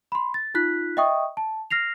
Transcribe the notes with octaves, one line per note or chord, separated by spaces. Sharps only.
B5 C6
A6
D#4 F4 F#6 B6
D#5 E5 G5 C#6 D#6
A5
F6 A#6 C7 F7